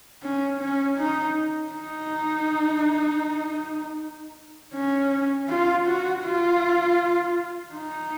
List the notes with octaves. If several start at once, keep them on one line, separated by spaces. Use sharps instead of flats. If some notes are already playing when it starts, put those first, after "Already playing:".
C#4
C#4
D#4
D#4
C#4
F4
F#4
F4
D#4